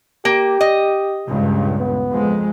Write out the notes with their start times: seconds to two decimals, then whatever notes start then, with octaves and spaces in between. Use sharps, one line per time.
0.25 A#3 G4
0.61 D#5
1.27 C#2 G2 A#2
1.79 B3
2.12 F2 G#3